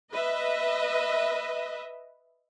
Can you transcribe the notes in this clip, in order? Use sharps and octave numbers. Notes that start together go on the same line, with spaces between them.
B4 D#5 E5